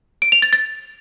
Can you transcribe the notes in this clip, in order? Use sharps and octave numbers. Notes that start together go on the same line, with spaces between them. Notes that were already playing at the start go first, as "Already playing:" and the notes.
D7
F7
A6
A6